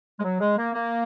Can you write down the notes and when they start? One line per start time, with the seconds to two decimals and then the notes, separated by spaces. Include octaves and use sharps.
0.19 G#3
0.23 F#3
0.40 G#3
0.57 A#3
0.73 A#3